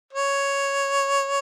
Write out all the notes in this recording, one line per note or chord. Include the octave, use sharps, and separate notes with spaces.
C#5